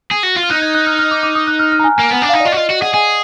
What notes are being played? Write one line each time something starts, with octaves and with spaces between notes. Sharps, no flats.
G#4
F#4
F4
F6
D#4 F#6
G#6
F#6
F6
F6
D6
D6
D#6
F#6
F6
F6
A#5
G#5
A#3 G#5
B3 F#5
D4
F5
D#4
D5
F4 D#5
F#4
F4 D#5
F#4
G#4 F#5
G#4 G#5